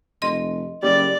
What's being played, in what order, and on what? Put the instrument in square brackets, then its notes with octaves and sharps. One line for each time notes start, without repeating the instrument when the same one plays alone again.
[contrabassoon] F1 [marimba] D#5 C6 A#6
[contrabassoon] F#1 [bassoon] G3 [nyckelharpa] D5